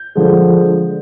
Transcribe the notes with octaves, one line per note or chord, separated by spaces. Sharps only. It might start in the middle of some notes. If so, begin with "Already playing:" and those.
Already playing: G6
D3 F3 G#3